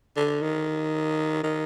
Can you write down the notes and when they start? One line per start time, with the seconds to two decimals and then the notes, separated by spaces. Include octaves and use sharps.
0.16 D3
0.42 D#3
1.43 D#3